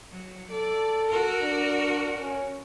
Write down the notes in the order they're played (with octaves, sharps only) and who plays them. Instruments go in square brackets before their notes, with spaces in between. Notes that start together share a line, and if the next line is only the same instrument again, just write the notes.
[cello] F#3
[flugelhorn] A4 [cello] D5
[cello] F#4 A#4
[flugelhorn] D4
C#4